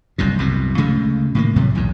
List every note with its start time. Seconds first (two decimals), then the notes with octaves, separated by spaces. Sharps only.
0.18 F#1 C2 G2 A#2
0.39 C2 F#2 B2
0.78 D2 C#3 G#3 A3
1.35 A2 D#3 A#3
1.56 A2 C3 F#3 G3
1.75 B1 E2 G#2